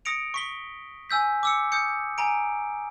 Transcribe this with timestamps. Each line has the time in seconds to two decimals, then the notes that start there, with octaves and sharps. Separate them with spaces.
0.05 D#6 A#6 C#7 D7 F7
0.34 C#6 B6 G7
1.10 G#5 E6 G6 B6
1.43 D6 E6 C#7
1.72 D#6 G6 C#7
2.18 G#5 A#5 D7